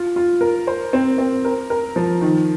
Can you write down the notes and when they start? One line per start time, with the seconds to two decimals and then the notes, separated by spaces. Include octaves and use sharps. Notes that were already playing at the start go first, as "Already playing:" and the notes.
Already playing: F4
0.16 F4
0.41 A#4
0.67 C5
0.93 C4
1.18 C4
1.45 A#4
1.70 A#4
1.96 F3
2.21 D#3